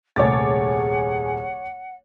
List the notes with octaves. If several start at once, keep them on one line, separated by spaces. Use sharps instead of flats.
D#1 C2 A3 G#4 C#5 F#5 D6 A6